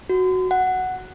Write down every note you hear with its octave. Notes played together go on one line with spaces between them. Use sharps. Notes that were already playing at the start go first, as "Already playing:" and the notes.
F#4
F#5